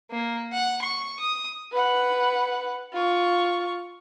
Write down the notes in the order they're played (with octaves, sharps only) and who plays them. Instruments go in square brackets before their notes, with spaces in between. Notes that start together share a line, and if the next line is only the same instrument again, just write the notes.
[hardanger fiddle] A#3
F#5
C#6
D#6
[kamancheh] B4 F#5
F4 C#6